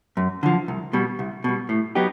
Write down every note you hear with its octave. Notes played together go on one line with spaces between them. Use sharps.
F#2
D3 F3
C2
B2 G3
C2
B2 G3
A2
F#3 B3 D#4 G4